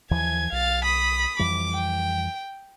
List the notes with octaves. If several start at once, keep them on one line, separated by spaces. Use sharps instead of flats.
D#2 E3 F3 G#5 G#6
B1 F5 A6
B5 D#6
F2 E3 G3 D6
G5